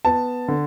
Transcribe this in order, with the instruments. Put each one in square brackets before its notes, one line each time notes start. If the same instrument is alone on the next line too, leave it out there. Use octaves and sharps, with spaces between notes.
[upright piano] B3 A5
D3